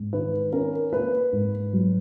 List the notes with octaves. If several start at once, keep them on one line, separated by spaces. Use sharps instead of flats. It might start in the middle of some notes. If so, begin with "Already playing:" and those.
Already playing: G#2
D#3 B4
C#4 A#4
A#3 B4
G#2
F#3